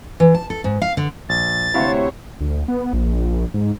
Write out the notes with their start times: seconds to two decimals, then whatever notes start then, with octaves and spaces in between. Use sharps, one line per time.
0.20 E3
0.34 A5
0.50 A4
0.64 G#2
0.82 F5
0.97 D3
1.29 A#1 A6
1.74 D2 C3 E4 F#4 C5 C#5 F5
2.41 D2
2.68 B3
2.93 A#1
3.54 G#2